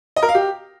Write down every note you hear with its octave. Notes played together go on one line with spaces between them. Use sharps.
D#5
A#4
F5
G4